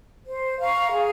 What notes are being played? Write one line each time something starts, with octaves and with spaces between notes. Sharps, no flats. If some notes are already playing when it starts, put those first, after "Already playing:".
C5
F5 A#5 C#6
G#4